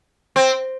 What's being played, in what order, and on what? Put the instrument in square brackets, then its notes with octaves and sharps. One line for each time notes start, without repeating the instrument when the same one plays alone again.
[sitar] C4